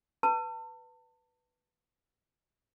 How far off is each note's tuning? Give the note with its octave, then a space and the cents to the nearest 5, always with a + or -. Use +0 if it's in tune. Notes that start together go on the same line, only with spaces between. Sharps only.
B4 +0 A5 +35